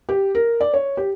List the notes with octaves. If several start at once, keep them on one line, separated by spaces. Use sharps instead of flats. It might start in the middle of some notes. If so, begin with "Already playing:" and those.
G4
A#4
D5
C#5
G4